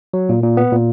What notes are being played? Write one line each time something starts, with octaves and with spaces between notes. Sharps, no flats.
F#3
A#2
A#2
B3
A#2